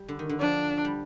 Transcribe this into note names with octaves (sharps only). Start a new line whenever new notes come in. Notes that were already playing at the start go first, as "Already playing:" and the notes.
Already playing: G3
D3
D#3
D3
F3 D4
G3